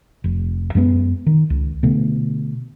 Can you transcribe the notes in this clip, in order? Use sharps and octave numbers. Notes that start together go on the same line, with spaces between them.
F1
F#2 G#3 A3 B3
D#3
C#2
B2 D3 A3